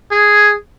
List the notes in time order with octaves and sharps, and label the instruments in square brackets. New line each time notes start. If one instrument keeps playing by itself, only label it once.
[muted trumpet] G#4